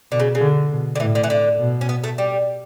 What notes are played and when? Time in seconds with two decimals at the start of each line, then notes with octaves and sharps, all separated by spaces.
0.12 B2 D3
0.20 C#3
0.35 C#3
0.41 D3
0.71 B2
0.95 D3
1.00 A2 E3
1.15 D3
1.24 E3
1.30 D3
1.59 B2
1.81 C#4
1.89 B3
2.04 A3
2.18 G3